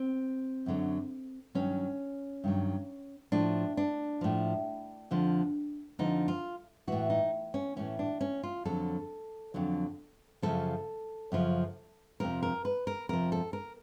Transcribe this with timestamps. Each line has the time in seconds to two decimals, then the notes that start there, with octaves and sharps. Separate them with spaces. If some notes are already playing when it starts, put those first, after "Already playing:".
Already playing: C4
0.66 F#2 D3 F#3
1.55 G2 D#3 F#3 C#4
2.44 G2 D#3 F#3
3.32 A2 F3 D4
3.77 D4
4.21 A2 F3
5.11 F2 D3 F3
5.99 F2 D3 F3 D#4
6.28 F4
6.87 A2 E3 F#4
7.10 D#4
7.54 C#4
7.76 A2 E3 C#4
7.99 D4
8.21 C#4
8.43 F4
8.65 F2 D3 F#3 A4
9.54 F2 D3 F#3
10.42 F#2 C#3 F3 A4
11.32 F#2 C#3 F3
12.20 F2 C3 F3 A#4
12.43 A#4
12.65 B4
12.87 A#4
13.09 F2 C3 F3 A#4
13.32 A4
13.53 A#4